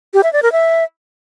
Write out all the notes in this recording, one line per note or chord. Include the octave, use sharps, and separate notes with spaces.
G4
E5
D5
A#4
E5